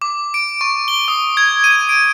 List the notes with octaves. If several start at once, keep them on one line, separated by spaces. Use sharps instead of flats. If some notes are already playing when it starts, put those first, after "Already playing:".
D6
D7
C#6
G7
D#6
G#6
D#7
D7